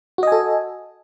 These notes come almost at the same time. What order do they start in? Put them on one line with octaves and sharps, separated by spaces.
F#4 D#5 G#5 A4